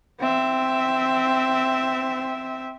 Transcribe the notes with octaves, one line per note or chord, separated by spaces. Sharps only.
C4 E5